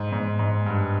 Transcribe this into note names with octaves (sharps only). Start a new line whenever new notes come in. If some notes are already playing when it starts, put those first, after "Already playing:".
Already playing: G#2
G#2
G#2
G2